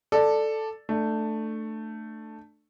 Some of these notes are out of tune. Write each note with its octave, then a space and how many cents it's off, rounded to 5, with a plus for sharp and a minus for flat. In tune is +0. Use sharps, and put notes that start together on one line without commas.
A4 +0 D5 +5
A3 +5 D4 +25